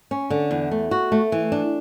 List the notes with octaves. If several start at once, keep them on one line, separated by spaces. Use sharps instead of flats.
C#4
D3
E2
A3
F#4
A3
E3
D4